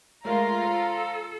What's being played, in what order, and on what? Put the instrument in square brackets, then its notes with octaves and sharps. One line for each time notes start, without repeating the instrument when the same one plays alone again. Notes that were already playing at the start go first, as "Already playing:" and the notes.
[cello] G#3 [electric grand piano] A3 A#4 [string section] F4 [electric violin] A#5
[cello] A4 [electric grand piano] C5 F5